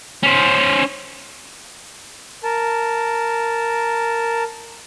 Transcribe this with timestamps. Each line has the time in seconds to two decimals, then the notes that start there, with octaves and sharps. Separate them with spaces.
0.23 C#4 C5
2.44 A#4 A5